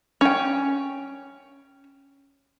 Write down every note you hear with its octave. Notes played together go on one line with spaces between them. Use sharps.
C#4 G5